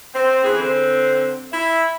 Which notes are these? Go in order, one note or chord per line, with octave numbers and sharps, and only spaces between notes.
C4
E3 G#4
D3 C4
E4 E5